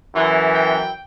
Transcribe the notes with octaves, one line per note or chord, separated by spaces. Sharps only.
F#2 E3
G5